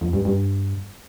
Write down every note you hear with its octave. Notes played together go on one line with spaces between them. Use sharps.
F2
G2
G2